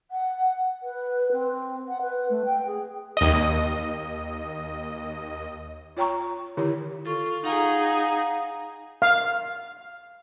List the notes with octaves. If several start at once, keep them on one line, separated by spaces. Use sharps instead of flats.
F#5
B4
C4
F#5
B4
A3
G5
G#4
D#2 D#5
F4 C#5 G5 A#5 C#6
D3 D#3 E4 G4 C#5
F4 A4 C#6
D#4 G#4 F5 F#5 A#5
F5